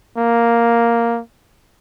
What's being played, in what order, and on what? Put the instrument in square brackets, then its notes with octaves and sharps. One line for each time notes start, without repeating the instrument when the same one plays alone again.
[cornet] A#3